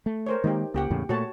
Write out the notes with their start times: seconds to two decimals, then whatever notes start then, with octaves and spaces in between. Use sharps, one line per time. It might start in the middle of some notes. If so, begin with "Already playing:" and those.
0.06 A3
0.26 A#4 C5 C#5
0.44 D#3 G#3 A#3 D#4 G4
0.74 C#2 A#3 G4 F#5
0.90 E2 A2 C#3
1.09 A#2 A3 F#4 C#5 A5